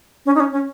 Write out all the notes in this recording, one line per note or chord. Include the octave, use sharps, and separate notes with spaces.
C#4
D#4
C#4
C#4